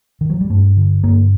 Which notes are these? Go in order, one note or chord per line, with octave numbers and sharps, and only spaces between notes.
D#3
F#3
G3
G2 A3
D3
G2 A#3